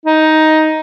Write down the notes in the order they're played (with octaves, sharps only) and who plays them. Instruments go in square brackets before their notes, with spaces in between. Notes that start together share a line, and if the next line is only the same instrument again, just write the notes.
[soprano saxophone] D#4